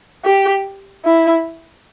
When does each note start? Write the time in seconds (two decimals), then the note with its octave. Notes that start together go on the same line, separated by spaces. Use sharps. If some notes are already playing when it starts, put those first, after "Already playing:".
0.25 G4
1.05 E4